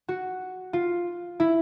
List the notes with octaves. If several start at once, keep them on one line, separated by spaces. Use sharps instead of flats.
F#4
F4
E4